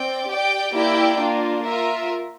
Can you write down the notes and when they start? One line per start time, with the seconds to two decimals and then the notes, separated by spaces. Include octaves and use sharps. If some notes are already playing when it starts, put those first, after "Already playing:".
Already playing: C4 D5 G5
0.28 G4 D5 G5
0.73 A#3 E4 G4 D5 G5
1.18 A#3 D4 F4
1.63 F4 A#4 E5